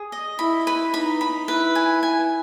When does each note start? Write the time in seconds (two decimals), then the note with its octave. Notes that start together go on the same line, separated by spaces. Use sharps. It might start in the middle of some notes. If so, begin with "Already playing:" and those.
Already playing: G#4
0.12 D#5
0.39 E4 B5
0.67 B4
0.93 D#4 B5
1.21 B5
1.48 E4 B4
1.75 G#5
2.03 G#5